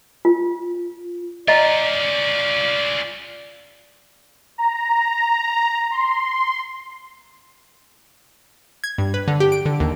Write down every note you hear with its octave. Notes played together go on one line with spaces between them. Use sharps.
F4
C#4 F4 D5 D#5 A#5
A#5
C6
G#6
G2
B4
D3
G4
D7
D3
D#2